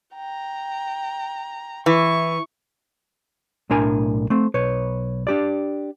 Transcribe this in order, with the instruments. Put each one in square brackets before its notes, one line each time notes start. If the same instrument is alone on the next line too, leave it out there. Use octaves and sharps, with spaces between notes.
[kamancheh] G5 A#5
[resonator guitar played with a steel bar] E3 [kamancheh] C#6
[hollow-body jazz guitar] B1 A2 D4 A#4 G#5
A3 C4
B1 B4 C#5
D4 G4 D5